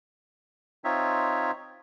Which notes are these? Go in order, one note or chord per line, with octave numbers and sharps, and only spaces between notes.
C4 D#4 F4 C#5 E5